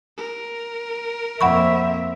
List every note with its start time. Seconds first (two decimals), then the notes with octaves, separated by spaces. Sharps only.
0.17 A#4
1.41 F2 A#3 C4 E5 F#5 B5 C#6